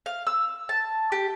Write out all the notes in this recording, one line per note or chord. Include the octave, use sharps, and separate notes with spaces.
F5
E6
A5
G4